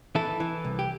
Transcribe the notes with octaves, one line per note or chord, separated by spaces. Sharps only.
E3 E4 A4
E3
C2
G4